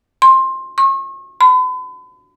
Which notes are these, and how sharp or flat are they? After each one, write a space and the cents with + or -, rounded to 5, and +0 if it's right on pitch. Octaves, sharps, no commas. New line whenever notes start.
C6 +15
C#6 -40
B5 +40